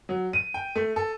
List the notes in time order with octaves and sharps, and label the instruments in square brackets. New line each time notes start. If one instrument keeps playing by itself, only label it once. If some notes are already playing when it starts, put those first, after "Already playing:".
[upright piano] F#3
D#7
G5
A3
A4